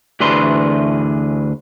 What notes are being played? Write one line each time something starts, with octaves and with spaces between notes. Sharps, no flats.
D2 E3 D4 G#4 B4 C6